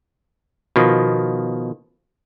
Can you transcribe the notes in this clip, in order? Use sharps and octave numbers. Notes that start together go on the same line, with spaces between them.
B2 D#3 F3